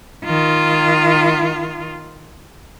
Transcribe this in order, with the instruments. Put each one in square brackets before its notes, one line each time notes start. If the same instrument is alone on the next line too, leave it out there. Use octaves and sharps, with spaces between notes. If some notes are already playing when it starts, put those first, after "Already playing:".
[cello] D#3 F4